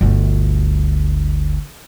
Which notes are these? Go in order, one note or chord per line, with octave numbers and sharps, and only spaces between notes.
G1 D2